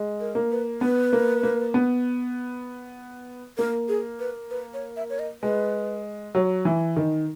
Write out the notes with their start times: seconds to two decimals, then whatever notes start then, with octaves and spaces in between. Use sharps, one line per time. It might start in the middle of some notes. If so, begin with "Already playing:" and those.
Already playing: G#3
0.20 A#4
0.35 A#3
0.51 B4
0.81 B3 B4
1.13 A#3
1.43 A#3
1.74 B3
3.58 A#3 A#4
3.89 G#4
4.19 B4
4.51 B4
4.74 C#5
4.96 E5
5.10 C#5
5.19 D#5
5.42 G#3 B4
6.35 F#3
6.65 E3
6.96 D#3